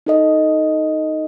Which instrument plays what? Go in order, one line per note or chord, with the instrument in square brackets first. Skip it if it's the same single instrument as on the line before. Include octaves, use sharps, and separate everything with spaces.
[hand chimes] D#4 A4 D#5